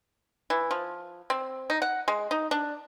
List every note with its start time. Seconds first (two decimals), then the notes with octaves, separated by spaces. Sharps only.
0.50 E3
0.71 F3
1.30 C4
1.70 D#4
1.82 F#5
2.08 G#3
2.31 D#4
2.51 D4